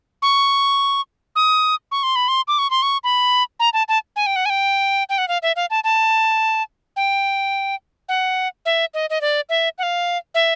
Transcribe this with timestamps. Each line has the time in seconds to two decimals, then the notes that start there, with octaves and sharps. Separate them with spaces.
0.22 C#6
1.36 D#6
1.92 C#6
2.03 C6
2.16 B5
2.28 C6
2.48 D6
2.59 C#6
2.70 C6
2.82 C#6
3.04 B5
3.60 A#5
3.73 A5
3.88 A5
4.16 G#5
4.26 G5
4.36 F#5
4.46 G#5
4.50 G5
5.09 G5
5.18 F#5
5.28 F5
5.42 E5
5.56 F5
5.70 A5
5.84 A5
6.96 G5
8.09 F#5
8.66 E5
8.94 D#5
9.10 D#5
9.21 D5
9.49 E5
9.78 F#5
9.83 F5
10.35 E5